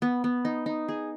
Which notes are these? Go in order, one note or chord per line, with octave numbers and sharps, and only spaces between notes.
B3
B3
D#4
D#4
G#4